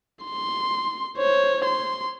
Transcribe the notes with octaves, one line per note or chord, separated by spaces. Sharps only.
C6
C5 C#5
C6